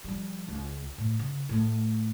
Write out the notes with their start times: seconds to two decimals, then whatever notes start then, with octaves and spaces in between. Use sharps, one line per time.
0.04 F3 G3
0.48 C#2
0.98 A2
1.19 C#3
1.49 A2 A3